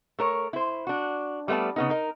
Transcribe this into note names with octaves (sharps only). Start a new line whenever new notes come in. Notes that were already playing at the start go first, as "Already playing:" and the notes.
A3 A#4 C#5
E4 C5
D4 F#4
G3 A3 B3 D5 A5
C#3 B3 D#4
D#4 A#4